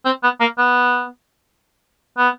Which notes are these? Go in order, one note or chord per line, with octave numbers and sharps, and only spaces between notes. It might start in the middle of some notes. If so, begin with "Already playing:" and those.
C4
B3
A#3
B3
B3